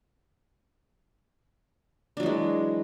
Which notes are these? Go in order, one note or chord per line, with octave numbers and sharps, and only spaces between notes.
E3 F#3 G#3 D4